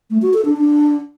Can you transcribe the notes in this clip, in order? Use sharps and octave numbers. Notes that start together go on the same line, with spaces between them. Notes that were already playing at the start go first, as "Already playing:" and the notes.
A3
F#4
A4
D4
D4